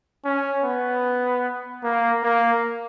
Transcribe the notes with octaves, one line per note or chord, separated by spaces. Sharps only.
C#4
B3
A#3
A#3